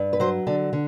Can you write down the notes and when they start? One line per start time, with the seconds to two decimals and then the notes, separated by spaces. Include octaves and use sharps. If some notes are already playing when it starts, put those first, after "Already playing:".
Already playing: G2
0.13 B4
0.20 F#3 C5
0.47 D3 A4
0.73 D3